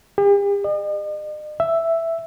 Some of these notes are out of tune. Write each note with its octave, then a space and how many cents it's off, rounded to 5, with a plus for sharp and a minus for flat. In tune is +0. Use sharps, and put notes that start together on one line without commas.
G4 +45
D#5 -45
E5 +5